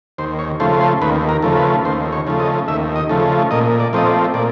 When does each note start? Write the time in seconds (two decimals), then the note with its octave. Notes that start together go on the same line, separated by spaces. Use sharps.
0.18 D#2 C5
0.39 C#5
0.60 C#3 F3 A3 C5
0.80 C5
1.02 D#2 B4
1.29 A#4
1.43 C#3 F3 A3
1.57 B4
1.85 D#2 C5
2.13 C#5
2.27 C#3 F3 A3
2.40 D#5
2.68 D#2 E5
2.96 D#5
3.09 C#3 F3 A3
3.51 A#2 D#5
3.80 D5
3.93 F3 A3 C4 D#5
4.07 D5
4.34 A#2 D5